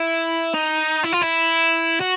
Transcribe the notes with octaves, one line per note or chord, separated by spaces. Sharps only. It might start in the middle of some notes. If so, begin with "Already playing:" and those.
Already playing: E4
D#4
E4
F4
E4
F#4